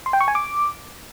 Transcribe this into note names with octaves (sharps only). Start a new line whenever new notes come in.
C6
G5
C#6
G#5
D6